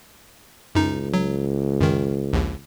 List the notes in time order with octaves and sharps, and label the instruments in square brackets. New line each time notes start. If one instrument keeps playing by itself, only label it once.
[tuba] C#2 [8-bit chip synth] F#2 D#4
[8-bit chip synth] F#3
F#2 D#3
A#1 D#2